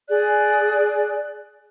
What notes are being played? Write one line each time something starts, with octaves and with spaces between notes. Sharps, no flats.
G#4 D5 F#6